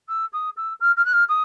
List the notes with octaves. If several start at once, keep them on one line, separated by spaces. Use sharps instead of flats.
E6
D#6
E6
F6
F6
F#6
F6
D#6